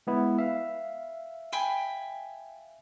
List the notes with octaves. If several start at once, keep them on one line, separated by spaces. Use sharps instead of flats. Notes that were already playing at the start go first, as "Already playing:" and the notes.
G#3 B3 E4
E5 F5
G5 G#5 B5